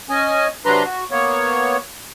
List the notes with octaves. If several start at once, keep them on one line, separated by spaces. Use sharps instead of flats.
C#4 D#5 G#5
C3 F#3 D4 B4 A#5 C6
F#4
A#3 B3 C#5